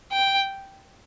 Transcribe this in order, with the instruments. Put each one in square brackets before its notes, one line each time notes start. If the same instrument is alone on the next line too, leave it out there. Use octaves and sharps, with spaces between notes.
[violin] G5